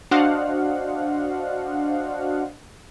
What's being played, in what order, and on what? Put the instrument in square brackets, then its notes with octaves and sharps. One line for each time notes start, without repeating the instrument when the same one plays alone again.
[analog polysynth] D4 F#4 C5 D#5 F5 F#5